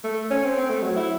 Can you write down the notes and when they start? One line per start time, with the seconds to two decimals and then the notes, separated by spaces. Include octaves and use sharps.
0.04 A3
0.30 C#4
0.44 C4
0.57 C4
0.70 A3
0.82 F#3
0.96 E4